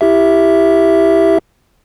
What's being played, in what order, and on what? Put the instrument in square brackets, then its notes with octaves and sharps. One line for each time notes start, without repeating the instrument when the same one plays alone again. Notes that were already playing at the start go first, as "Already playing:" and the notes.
[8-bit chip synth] E4 G4 E5